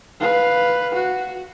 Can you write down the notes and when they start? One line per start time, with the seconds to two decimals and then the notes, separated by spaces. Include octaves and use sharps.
0.20 B4 F5
0.94 F#4